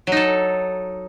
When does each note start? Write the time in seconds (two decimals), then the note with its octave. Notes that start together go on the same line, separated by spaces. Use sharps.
0.07 F#3
0.12 D#4
0.17 A4